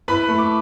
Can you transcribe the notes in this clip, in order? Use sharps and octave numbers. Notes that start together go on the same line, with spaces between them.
E4 B4 B5
A3
D6